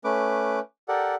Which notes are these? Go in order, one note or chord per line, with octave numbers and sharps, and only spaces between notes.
A3 C#4 B4 D6
G4 A4 A#4 D5 F#5